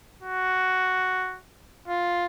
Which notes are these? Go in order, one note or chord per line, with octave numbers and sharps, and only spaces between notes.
F#4
F4